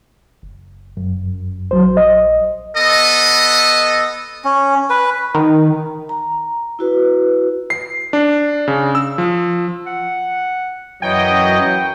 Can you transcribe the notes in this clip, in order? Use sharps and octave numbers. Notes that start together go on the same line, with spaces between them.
F#1
F#2
A#1 F#3 C5
D#5
B3 A4 D#5
C#4
B4
D#3
A#5
E4 F#4 B4
C7
D4
C#3
E6
F3
F#5
F#2 E3 F#3 C#5 D#5 G5